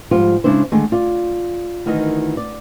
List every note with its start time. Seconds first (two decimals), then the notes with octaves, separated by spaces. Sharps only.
0.11 G#2 F3 G3 F4
0.44 C#3 G#3 D4 E4 C5
0.72 D3 D#3 G#3 A3
0.92 F4 D5
1.86 D2 D#3 E3 D#4 A#4 D#5
2.37 D5